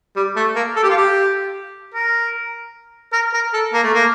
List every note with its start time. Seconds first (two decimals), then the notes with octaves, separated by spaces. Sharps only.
0.16 G3
0.36 A3
0.56 A#3
0.76 A4
0.83 G4
0.90 F4
0.97 G4
1.94 A#4
3.13 A#4
3.34 A#4
3.54 A4
3.73 A#3
3.83 A3
3.94 A#3